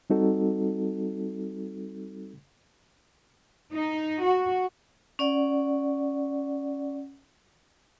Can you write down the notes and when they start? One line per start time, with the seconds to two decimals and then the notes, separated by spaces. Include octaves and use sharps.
0.10 G3 C4 D#4 F#4 A4
3.73 D#4
4.25 F#4
5.19 C#4 D5 F#5